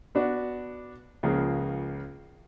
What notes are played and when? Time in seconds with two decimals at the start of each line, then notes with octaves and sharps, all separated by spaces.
0.15 B3 D4 F#4
1.23 C#2 C#3 F3 A#3